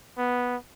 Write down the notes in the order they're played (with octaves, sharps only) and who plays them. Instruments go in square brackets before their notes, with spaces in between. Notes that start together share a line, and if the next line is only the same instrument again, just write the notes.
[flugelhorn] B3